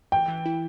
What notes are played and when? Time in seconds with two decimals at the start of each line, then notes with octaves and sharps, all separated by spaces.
0.12 E3 G5
0.28 E3
0.46 E4